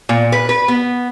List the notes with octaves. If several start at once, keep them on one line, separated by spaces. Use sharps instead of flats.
A#2
B4
B4
B3